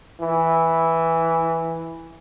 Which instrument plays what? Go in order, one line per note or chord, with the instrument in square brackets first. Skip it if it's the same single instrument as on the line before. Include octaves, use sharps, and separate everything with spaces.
[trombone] E3